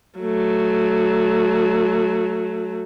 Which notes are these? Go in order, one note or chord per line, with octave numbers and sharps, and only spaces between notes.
F#3 A3